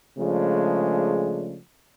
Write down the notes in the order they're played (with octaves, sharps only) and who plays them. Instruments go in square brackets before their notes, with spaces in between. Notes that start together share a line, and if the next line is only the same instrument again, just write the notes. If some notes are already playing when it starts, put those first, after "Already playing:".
[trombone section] C#3 F3 G#3 A3 D4